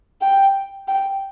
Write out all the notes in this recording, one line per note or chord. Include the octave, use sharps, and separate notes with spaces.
G5
G5